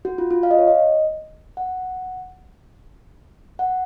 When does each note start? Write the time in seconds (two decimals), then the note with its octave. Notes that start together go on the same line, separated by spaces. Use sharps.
0.05 F#4
0.18 F4
0.31 F4
0.43 F5
0.51 D#5
0.59 C#5
0.68 D#5
1.57 F#5
3.59 F#5